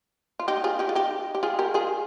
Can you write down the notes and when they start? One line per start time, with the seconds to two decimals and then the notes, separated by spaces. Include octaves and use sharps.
0.39 F4
0.48 D#4 G4
0.64 F4 G#4
0.79 D#4 G4
0.89 F4
0.95 D#4 G4
1.35 G4
1.43 F4 G#4
1.59 G4 A#4
1.74 F4 G#4